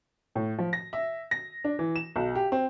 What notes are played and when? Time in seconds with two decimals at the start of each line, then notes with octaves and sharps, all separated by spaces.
0.35 A2
0.58 F3
0.73 A#6
0.93 E5
1.31 A#6
1.64 D4
1.79 E3
1.96 E7
2.16 B1
2.35 G4
2.52 C4